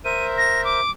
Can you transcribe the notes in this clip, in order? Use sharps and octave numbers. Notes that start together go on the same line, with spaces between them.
A#4 C5 E5 D#7
A#6
D6